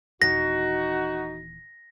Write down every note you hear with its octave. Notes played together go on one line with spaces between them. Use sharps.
D#1 E3 D#4 F#4 A#6